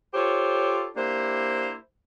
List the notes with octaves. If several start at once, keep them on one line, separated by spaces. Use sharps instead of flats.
F4 G4 A4 C5 C#5
A#3 D4 E4 G4 C5